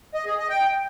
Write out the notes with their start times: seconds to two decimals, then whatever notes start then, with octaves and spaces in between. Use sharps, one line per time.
0.14 D#5
0.26 G#4
0.38 D#5
0.49 G5